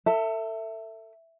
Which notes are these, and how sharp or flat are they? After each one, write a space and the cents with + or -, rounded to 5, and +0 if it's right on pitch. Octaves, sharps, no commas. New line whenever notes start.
A4 +30 E5 +0